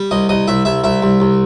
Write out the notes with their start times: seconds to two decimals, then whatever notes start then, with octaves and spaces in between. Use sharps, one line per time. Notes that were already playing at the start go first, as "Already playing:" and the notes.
Already playing: G3
0.11 C2 D#5
0.29 C2 D#5
0.48 C2 E5
0.65 C2 E5
0.84 C2 E5
1.02 C2
1.20 C2